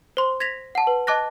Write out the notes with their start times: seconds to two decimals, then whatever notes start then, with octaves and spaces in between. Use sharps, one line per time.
0.17 C5 C6
0.40 G#6 A#6 B6 F7
0.75 F#5 A5
0.87 B4
1.07 D#5 A5 D6 F#6 A#6